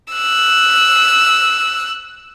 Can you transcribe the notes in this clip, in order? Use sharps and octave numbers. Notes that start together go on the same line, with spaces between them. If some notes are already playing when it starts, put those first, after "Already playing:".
E6 F#6